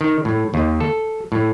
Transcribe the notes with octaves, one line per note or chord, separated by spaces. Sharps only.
D#3
A2
D#2
A4
A2